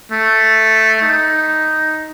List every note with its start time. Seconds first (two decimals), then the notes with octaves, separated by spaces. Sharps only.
0.12 A3
1.02 D#4